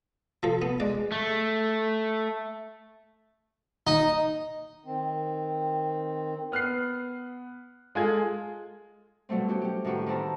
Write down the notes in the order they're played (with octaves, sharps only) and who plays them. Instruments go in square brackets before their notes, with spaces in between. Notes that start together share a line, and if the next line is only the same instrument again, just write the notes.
[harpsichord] F3 A4
B3
[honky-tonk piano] G#3 [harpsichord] D5
[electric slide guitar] A3
[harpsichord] D#4
[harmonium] D#3 C4
[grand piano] B3 F6 F#6 C7
G#3 F4 G#4 A4 G#6
[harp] B2 F#3 G3 A3 C4
C#4 F#4 G4
C#4 G4
A2 D#3 F#4 G4 B4
D#3 C4 E4 A5 A#5